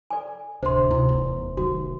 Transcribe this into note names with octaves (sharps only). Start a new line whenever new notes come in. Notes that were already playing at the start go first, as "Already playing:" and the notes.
A4 D5 G#5
D1 C3 D4 C5 C6
D2 C3 D#4 E4
F1 E2
D#3 F#3 F#4